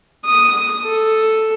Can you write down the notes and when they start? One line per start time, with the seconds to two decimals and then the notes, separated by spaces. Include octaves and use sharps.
0.25 D#6
0.85 A4